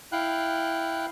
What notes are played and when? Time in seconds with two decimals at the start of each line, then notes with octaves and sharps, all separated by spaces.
0.12 E4 F5 G5 F#6